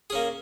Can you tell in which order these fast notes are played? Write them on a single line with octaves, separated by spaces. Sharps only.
G#4 C#4 A#3